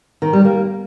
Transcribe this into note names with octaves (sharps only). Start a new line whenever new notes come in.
D#3
G3
A#3